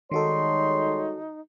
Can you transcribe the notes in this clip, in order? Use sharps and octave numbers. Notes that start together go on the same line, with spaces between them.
D#3 G3 G#3 D#4 F#4 A4 C#5 C6